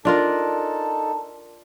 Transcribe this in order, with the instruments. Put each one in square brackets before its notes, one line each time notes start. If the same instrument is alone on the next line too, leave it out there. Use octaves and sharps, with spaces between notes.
[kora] D4 F4 A#4 [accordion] D#4 A4 A5